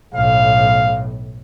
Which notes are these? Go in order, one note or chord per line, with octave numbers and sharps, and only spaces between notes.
B1 A2 F5